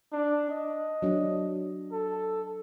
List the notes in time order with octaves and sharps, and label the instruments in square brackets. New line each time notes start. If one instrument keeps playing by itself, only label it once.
[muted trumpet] D4
D#5
[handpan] F#3 D4
[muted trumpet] A4